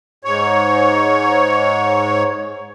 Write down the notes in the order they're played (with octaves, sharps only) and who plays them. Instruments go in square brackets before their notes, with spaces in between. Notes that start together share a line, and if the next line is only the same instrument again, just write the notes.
[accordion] G#2 C#5